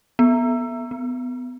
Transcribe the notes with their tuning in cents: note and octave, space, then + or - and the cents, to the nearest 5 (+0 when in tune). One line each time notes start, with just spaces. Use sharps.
B3 -10
B3 +25